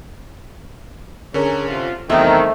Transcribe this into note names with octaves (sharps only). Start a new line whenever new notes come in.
D3 C#4 G#4 A#4 C#5
C3 F4
E2 C3 D#3 G3 A3 C4 E4